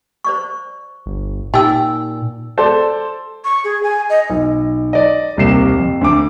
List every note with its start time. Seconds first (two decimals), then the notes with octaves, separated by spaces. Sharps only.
0.24 C5 D5 C#6
1.06 G1
1.54 A#2 D#4 G4 G5 G#5 E6
2.58 A4 C5 D5
3.44 C#6
3.64 G#4
3.83 G#5
4.10 D#5
4.30 B1
4.93 D5 D#5
5.37 D#1 C2 C3 A#3 C7 E7
5.79 F2
6.01 D2 D6